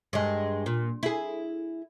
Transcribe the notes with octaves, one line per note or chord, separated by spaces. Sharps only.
G2 G#3
A#2
E4 G#4